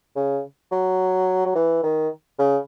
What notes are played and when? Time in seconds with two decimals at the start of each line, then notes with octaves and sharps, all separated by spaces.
0.16 C#3
0.72 F#3
1.46 F#3
1.55 E3
1.83 D#3
2.39 C#3